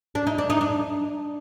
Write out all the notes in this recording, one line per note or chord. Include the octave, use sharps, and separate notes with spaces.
D4
D#4
D4
D#4
D4